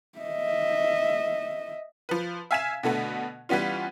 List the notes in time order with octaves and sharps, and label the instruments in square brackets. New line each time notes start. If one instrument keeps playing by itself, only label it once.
[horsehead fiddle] D#5 E5
[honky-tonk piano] F3 B4
E5 F5 G#5 G#6 B6 E7
B2 D3 A3 B3
E3 G3 B3 C#4 F4